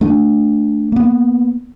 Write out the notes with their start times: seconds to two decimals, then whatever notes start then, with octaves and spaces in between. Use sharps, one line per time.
0.01 A3 D4
0.92 A#3 B3